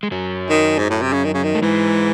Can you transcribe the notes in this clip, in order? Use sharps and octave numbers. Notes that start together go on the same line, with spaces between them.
G#3
F#2 F#3
D#3
G#2
A2
C3
C#3
D#3
C#3
D#3
A3
G#2 E3 G#3